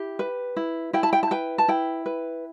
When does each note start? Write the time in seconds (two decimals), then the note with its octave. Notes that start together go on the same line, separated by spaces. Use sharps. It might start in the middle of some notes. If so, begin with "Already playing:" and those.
Already playing: E4 G4
0.19 B4
0.57 E4
0.93 E4 G5
1.03 A5
1.13 G5
1.23 A5
1.31 B4 G5
1.58 A5
1.68 E4 G5
2.06 B4